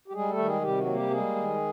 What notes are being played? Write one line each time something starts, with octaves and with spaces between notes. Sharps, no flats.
G4
G3 G#3 G#4
A3 A4
D#3
G#3 G#4
C3 G3 G4
F#3 F#4
A#3
G3 G4
G3 G#3 G#4
D#3